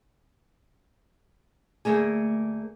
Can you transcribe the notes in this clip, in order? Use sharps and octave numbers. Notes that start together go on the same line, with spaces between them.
D2 A#2 A3 A#3 G#4